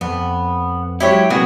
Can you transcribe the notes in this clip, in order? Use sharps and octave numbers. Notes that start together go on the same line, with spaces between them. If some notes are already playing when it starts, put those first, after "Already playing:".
F2 B3
F#3 G#3 E4 G4 C#5
C3 F#3 A#3 B3 F#4 G#4